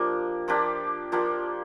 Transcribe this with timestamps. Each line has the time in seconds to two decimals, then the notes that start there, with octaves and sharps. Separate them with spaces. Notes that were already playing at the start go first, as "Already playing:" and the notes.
Already playing: F3 A#3 D4 G4
0.48 F3 A#3 D4 G4
1.12 F3 A#3 D4 G4